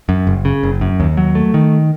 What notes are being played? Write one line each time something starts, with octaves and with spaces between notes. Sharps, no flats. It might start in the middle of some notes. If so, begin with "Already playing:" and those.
F#2
F#1
C#3
F#1
F#2
D#2
F#3
A3
D#3